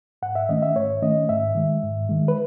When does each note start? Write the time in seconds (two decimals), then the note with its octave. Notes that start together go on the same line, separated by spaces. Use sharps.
0.22 G#2 F#5
0.35 E5
0.49 D#3 A3 C#4 D#5
0.62 E5
0.76 G#2 C#5
1.02 D#3 A3 C#4 D#5
1.29 G#2 E5
1.55 D#3 G#3
1.83 G#2
2.09 D#3 G#3
2.28 B4